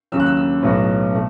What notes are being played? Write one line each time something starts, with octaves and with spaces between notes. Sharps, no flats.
D#2 C#3 F#3 E6
F#6
E6
E6
B1 A2 F#3 B3 D#4
B2 A3